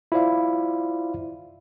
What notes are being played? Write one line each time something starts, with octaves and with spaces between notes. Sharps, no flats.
E4 F4 C5 D5 F5